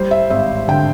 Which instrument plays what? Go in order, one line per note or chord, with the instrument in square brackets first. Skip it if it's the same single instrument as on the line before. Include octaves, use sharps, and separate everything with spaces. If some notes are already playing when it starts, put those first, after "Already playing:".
Already playing: [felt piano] G3 C5
E5
G#1 E5
D3 G5